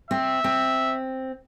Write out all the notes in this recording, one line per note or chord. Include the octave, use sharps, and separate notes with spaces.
C4 E5
C4